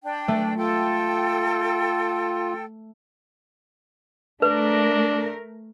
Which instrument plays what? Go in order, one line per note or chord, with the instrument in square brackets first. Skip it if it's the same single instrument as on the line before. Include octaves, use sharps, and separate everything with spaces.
[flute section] D4 G5
[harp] A3
[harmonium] F4 [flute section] A4 G5
[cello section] A3 A#4 [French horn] D4 [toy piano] B4